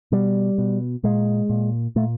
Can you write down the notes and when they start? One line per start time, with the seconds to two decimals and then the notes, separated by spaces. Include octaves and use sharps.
0.12 B2 G3
0.58 B2
1.04 A#2 G#3
1.49 A#2
1.96 A#2 A3